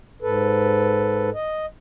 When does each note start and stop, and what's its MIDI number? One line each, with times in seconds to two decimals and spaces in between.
0.22 1.30 44
0.22 1.30 69
0.22 1.30 71
1.34 1.66 75